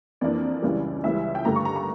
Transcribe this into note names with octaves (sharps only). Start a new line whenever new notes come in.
F2 E3 A#3 D4 D5
C#2 C#3 E3 G3
C#2 C#3 E3 G3 E5
G5
G2 D3 A3 A#5
C#6
A#5
A#5